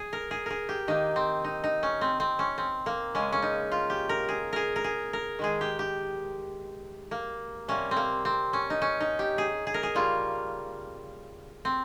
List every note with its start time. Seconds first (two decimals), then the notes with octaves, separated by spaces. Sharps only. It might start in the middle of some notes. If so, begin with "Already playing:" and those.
Already playing: G#4
0.13 A#4
0.31 G#4
0.46 G#4 A#4
0.69 G4
0.88 D#3 A#3 D#4
1.16 C4
1.44 D#4
1.64 D#4
1.83 C#4
2.01 C4
2.20 C4
2.39 C#4
2.58 C4
2.86 A#3
3.15 C#3 G#3 C#4
3.32 C#4
3.42 D#4
3.72 F4
3.90 G4
4.09 A#4
4.29 G#4
4.53 G#4 A#4
4.76 A#4
4.84 G#4
5.13 A#4
5.39 D#3 G#3 G#4
5.61 G4
5.79 G4
7.11 A#3
7.68 C3 G3 A#3 C#4
7.91 C4
7.96 A#3
8.25 C4
8.53 C#4
8.70 D#4
8.82 C#4
9.01 D#4
9.19 G4
9.38 G#4
9.67 G#4
9.74 A#4
9.83 G#4
9.95 C#3 G3 A#3 F4
11.65 C4